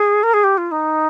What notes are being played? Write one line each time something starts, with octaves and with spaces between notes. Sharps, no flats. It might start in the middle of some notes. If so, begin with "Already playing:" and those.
Already playing: G#4
A#4
G#4
G4
F4
D#4